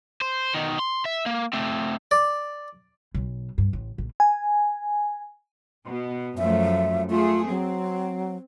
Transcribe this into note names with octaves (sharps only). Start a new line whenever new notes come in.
C5
B2 D#3
C6
E5
A#3
A3 C4
D5
B1
G2
A1
A#1
G#5
B2
F#2 F3 A3 E5
A3 F4 G#4
F#3 C4